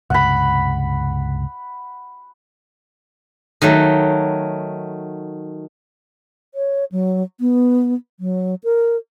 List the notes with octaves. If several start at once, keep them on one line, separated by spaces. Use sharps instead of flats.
C#2 G2 C3 F#5 B5
D#3 F#3 A3
C#5
F#3
B3
F#3
A#4